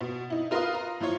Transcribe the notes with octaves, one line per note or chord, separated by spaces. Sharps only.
B2
D#4 E4
F4 A#4 B4 F5 C6 D#6
A#5
F3 E4 F4 C#5